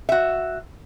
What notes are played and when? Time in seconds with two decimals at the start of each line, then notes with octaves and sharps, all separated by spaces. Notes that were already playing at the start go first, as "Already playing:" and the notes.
0.09 F#4 E5